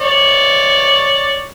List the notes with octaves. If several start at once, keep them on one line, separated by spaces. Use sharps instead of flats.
C#5 D5